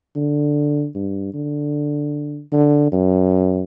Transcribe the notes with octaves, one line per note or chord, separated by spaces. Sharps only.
D3
G2
D3
D3
F#2